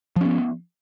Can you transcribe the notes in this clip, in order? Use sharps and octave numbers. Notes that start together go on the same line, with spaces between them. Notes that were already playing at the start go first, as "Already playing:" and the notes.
F3 B3 C#4